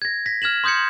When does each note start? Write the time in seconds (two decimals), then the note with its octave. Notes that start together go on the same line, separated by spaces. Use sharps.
0.02 G#6 A#6
0.26 A#6 B6
0.42 F6 G#6 E7 F#7
0.64 C6 D#6 G6 G#6 C#7